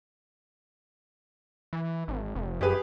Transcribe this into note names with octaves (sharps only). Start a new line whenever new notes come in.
E3
G#1
F1
F#2 G4 G#4 B4